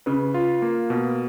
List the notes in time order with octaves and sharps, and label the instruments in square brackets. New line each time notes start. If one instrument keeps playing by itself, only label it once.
[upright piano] C#3 [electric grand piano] B4
[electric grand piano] F4
A#3
B2